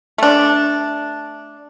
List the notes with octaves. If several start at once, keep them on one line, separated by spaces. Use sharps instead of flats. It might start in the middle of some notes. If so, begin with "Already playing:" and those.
A3 D4